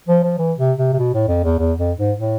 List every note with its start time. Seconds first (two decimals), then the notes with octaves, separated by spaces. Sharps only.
0.08 F3
0.23 F3
0.38 E3
0.58 C3
0.78 C3
0.93 C3
0.99 B2
1.14 A2
1.28 F2
1.44 E2
1.59 E2
1.78 F2
1.98 G#2
2.19 A2